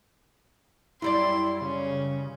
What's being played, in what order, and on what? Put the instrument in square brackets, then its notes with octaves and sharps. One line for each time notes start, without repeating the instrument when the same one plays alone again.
[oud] F#2 G3 D5 [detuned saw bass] E4 [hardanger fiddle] C6
[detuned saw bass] C#3 [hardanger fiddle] C#4